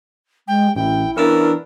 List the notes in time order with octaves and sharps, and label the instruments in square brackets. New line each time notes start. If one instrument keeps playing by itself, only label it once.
[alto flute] G#3 [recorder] G5
[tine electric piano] A1 [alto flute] E4 [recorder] G5
[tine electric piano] E3 E6 A6 [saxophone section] B3 C#4 A#4 [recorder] D4